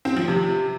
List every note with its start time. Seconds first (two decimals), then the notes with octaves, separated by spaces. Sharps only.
0.05 C4
0.17 F3
0.28 C3